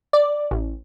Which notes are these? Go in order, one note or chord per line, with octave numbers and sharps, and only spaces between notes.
D5
A1